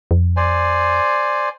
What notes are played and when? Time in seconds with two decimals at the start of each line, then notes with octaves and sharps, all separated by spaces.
0.11 F2
0.37 C5 D5 G#5